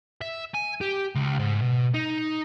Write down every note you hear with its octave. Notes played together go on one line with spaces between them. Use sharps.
E5
G#5
G4
C#2
G#2
B2
D#4